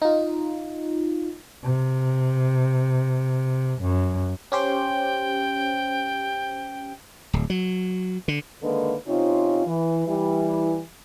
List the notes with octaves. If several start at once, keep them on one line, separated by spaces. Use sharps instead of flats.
D#4 F4
C3
F#2
C#4 G4 C5 G5
D1
F#3
D3
D3 D#3 G#3 A#3 D#4 B4
C3 C4 C#4 D#4 F4
E3
E3 G3 E4